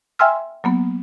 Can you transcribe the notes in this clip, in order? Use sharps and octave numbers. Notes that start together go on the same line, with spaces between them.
E5 G5 G#5 C6 E6 F6
F#3 A#3 B3